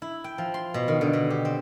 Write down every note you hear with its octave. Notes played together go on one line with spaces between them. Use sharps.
E4
G5
F3
C6
B2
D#3
D3
B2
G4
C4